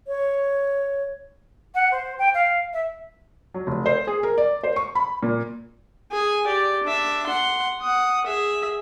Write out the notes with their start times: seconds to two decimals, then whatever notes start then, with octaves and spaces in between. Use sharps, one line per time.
0.07 C#5
1.74 F#5
1.91 C5
2.18 G5
2.34 F5
2.73 E5
3.54 F#3
3.67 F1
3.86 C5
4.07 G#4
4.23 A#4
4.38 D5
4.63 C5
4.76 C#6
4.95 B5
5.23 A#2
6.12 G#4 G#5
6.46 G4 D5
6.83 D4 E5
7.27 F#5 C6
7.81 F#5 D#6
8.26 G#4 E5